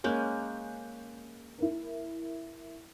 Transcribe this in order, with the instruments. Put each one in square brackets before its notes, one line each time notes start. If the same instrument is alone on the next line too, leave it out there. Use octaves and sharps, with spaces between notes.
[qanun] G#3 A#3 C#4 [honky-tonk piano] F#6 G6
[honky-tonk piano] E4 A#4